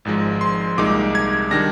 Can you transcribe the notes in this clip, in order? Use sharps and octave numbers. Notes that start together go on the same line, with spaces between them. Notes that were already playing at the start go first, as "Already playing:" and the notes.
G#1 G#2 F3 G#3
C6
C2 A#2 G#3 D#4 D6
G#6
D#3 G3 D4 A#6